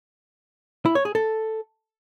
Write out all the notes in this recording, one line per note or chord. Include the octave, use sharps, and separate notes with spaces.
E4
C#5
G#4
A4